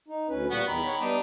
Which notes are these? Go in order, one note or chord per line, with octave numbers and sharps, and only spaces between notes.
D#4
D2 C#4 B4
A#2 G3 A#3 B3 F#4
E2 D#3 B5
C#5 F#5
G3 B3 D4 D#4